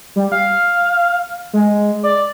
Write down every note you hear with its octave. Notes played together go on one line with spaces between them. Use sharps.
G3
F5
G#3
D5